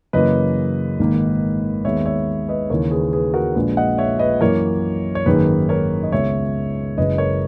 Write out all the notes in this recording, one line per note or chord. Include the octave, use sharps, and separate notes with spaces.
F#2 C#3 E3 A#3 B4 D#5
G#1 G#2 D#3 A#3
D#2 D#3 G#3 B3 C#5 E5
C#5 E5
B4 D#5
D#2 C#3 E3 A#4 C#5
G#4 B4
G#4 B4
F#4 A#4
A#1 A#2 G#3 G#4 B4
D#5 F#5
C#5 E5
B4 D#5
F#2 E3 A#3 A#4 C#5
C#5
G#1 F#2 D#3 A#3 G#4 B4
A#4 C#5
D#5
C#2 C#3 G#3 B3 C#5 E5
F#1 F#2 C#3 E3 G#3 B4 D#5
A#4 C#5